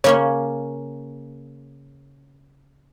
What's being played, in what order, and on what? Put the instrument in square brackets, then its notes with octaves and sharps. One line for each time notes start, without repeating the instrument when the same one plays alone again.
[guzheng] C#3 A#3 C#4 [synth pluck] C#5